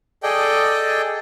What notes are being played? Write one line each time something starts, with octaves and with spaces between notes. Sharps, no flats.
G#4 A4 D5 D#5 G5